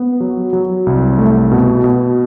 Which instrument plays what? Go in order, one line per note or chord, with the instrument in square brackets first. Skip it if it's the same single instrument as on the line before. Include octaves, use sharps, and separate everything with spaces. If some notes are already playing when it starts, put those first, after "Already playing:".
Already playing: [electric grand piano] B3
F#3
F#3
C2
A3
B2
B2